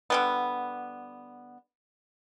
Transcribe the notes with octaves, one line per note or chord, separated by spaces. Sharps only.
D3 G3 B3